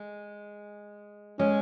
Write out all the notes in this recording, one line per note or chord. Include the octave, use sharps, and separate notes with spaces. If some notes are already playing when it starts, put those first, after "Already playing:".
Already playing: G#3
G#3 C#4